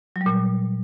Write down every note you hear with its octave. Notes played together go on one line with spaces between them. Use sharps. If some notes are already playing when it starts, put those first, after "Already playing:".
F#3
G3
A#2